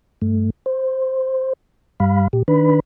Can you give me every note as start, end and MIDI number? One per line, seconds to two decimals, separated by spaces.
0.22 0.50 43
0.22 0.50 57
0.66 1.53 72
2.00 2.28 43
2.00 2.28 55
2.00 2.28 77
2.00 2.28 83
2.33 2.43 46
2.33 2.43 67
2.48 2.80 51
2.48 2.80 62
2.48 2.80 71
2.48 2.80 83